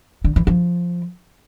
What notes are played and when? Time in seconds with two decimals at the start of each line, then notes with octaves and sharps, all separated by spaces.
0.24 D3
0.36 E3
0.47 F3